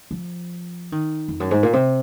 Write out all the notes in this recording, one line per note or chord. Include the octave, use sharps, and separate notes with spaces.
F3
D#3
F2
F#2
G#2
A#2
C3